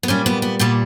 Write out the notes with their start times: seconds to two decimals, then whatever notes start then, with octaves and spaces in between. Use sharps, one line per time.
0.03 B3
0.08 A#2 G3 C#4
0.26 B3
0.42 B3
0.59 A#2 G3 B3